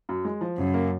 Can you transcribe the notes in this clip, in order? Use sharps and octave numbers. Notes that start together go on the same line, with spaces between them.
F#2
G#3
F3
F#2 C#3
A#3